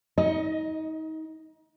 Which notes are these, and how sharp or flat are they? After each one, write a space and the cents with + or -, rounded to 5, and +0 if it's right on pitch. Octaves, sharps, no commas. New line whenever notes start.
D#4 +30 D#5 +0